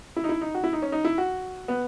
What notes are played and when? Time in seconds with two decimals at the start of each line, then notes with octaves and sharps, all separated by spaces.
0.17 E4
0.24 D#4
0.29 E4
0.41 D#4
0.55 F#4
0.64 E4
0.73 D#4
0.82 C#4
0.92 D#4
1.05 E4
1.18 F#4
1.68 B3